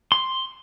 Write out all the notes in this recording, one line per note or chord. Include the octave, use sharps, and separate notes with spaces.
C6